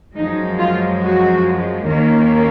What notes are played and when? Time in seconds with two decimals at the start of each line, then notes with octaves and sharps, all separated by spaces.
0.17 F#2 F3 G#3 D#4
0.59 F4
1.03 F#4
1.88 D#2 D#3 A#3 C#4